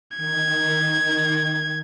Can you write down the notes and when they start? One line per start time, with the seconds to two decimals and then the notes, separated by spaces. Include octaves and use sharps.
0.17 D#3 G#6